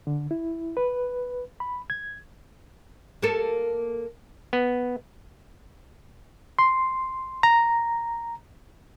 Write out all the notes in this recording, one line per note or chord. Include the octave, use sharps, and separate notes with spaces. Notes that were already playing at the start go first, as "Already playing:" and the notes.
D3
E4
B4
B5
G#6
A#3 A4
B3
C6
A#5